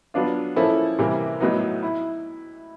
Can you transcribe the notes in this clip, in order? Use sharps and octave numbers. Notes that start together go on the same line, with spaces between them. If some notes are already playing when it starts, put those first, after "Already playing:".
F#3 B3 D4 F4
F3 A#3 C#4 E4 A4
C3 E3 G3 A#3
A2 F#3 B3 D#4
E4